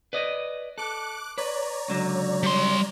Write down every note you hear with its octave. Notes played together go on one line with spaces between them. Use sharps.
B4 D5 D#5
A4 D6 F#6
B4 C#5 D5 A#5
C#2 D3 F#3
G3 C6